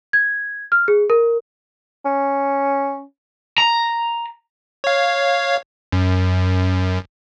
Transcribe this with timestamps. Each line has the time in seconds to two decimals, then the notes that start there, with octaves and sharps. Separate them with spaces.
0.13 G#6
0.72 F6
0.88 G#4
1.10 A#4
2.05 C#4
3.58 A#5
4.84 C#5 F5
5.92 F#2